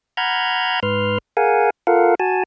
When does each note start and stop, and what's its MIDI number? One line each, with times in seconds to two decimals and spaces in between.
0.17 0.80 78
0.17 0.80 82
0.17 0.80 83
0.17 0.80 89
0.17 0.80 91
0.17 0.80 92
0.83 1.18 44
0.83 1.18 71
0.83 1.18 84
0.83 1.18 89
1.37 1.70 68
1.37 1.70 70
1.37 1.70 77
1.37 1.70 78
1.37 1.70 80
1.87 2.15 65
1.87 2.15 69
1.87 2.15 70
1.87 2.15 77
1.87 2.15 78
2.20 2.43 66
2.20 2.43 80
2.20 2.43 81